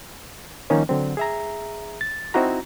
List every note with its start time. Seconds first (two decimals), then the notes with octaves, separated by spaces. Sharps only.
0.70 D#3 F3 G3 A#3 C#4 D#4
0.89 D3 F#3 C4
1.17 G#4 E5 A#5
2.01 A6
2.34 C4 D#4 E4 F#4 A#5